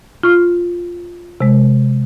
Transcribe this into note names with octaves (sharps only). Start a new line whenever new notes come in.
F4 C#6 F6
C3 G#3